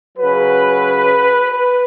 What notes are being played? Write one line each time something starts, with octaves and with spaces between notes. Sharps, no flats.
C#3 F#3 B4
B4